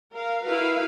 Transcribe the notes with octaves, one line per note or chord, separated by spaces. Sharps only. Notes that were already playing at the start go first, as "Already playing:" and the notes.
A#4 F5
E4 F#4 A#4 B4 F5